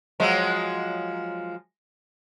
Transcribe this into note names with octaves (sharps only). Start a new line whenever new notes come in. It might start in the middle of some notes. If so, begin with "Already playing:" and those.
F3 F#3 G#3